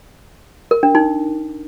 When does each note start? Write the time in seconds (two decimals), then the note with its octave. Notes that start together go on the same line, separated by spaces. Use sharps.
0.71 A#4
0.83 D4
0.95 D#4